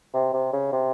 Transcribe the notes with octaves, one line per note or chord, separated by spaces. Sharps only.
C3
C3
C#3
C3